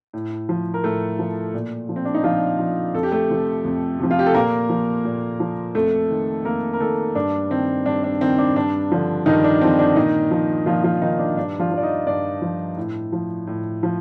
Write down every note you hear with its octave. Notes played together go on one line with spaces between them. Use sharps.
A2
F3
A#4
A2 A3 A4
F3
A#2
F3
C4
D4
D#4
A#2 F3 F4
F3
F2 A4
G4
A3 A4
C3 F3
F2
C3 F3
F4
G4
A4
A#2 A#3 A#4
F3
A#2
F3
F2 A3 A4
D#3
F2 A#3 A#4
A#4
D#3 A3 A4
G2 D4
D#3 C4
G2 D4
D4
D#3 C4
D4
G2 D4
D3 F3
G2 D#3 D#4
D4
D3 F3 C4
D4
A#2 D#3 D#4
F3
A#2 F3 F4
F3 F4
D#3 F3 D#4
D4
G2 D4
F3 F4
F3
D5
D#4 D#5
G2 D4 D5
F3
A2
F3
A2
F3